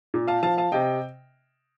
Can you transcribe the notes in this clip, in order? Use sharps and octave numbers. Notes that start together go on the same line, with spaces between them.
A#2
F5 A5
F3 F5 A5
F5 A5
C3 D#5 G5